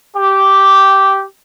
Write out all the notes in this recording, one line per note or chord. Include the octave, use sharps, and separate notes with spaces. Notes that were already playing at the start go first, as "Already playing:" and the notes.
G4